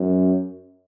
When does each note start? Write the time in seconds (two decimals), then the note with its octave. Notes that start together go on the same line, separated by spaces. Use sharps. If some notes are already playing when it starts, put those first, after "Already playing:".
Already playing: F#2